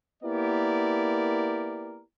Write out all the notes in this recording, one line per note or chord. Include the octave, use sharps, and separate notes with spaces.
A#3 B3 E4 G4 A#4 D5